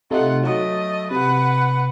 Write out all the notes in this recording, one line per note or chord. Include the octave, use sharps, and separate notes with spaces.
C3 A3 D#4 F4 F#5
F#3 A3 D#5
C3 B4 F#5